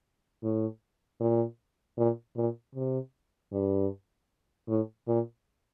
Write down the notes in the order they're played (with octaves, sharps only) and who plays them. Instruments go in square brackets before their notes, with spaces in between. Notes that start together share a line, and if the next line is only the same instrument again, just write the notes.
[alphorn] A2
A#2
A#2
A#2
C3
G2
A2
A#2